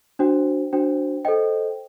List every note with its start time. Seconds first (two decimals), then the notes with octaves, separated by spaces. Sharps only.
0.19 D4 F#4 C5 G5
0.73 D4 F#4 C5 G5
1.25 A4 C5 D#5 G5